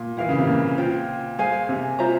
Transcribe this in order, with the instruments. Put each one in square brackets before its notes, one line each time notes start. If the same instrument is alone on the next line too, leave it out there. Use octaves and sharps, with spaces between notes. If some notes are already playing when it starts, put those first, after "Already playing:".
Already playing: [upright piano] A#2
[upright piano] E3 [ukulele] E4 A#4 F5
[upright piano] C#3
C3
A#2
[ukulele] F4 C5 G5
G#4 C5 F5 G#5
[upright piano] C3
[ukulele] F4 C5 E5 A#5